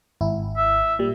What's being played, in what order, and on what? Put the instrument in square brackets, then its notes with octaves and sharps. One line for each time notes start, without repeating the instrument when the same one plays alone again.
[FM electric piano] G#1 E4
[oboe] E5
[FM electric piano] A#2 G3